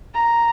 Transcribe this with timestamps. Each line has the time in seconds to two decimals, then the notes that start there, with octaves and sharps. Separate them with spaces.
0.14 A#5